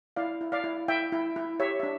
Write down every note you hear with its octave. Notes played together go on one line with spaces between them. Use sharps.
E4 D5 F5
E4
D5 F5
E4
E4 E5 G5
E4
E4
G4 C#5 E5
E5
D4